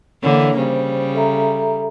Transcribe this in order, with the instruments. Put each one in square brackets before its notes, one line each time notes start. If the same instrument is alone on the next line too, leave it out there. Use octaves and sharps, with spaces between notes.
[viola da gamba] D3 E3 A#3 [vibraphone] C#5
[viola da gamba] C#3 G3 [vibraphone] C5
[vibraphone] A4 E5 A#5